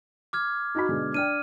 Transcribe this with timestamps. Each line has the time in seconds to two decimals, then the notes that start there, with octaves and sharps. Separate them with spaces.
0.33 D6 F6 G#6
0.75 D#4 F#4 B5
0.88 B2 D3 G#3
1.14 D4 G5 F6 D#7